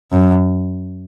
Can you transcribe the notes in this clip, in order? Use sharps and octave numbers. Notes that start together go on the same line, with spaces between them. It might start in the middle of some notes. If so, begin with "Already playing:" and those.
F#2